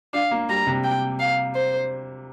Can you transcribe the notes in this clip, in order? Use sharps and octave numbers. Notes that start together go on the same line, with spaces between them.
D4 F5
A#3
G3 A#5
C3
G5
F5
C5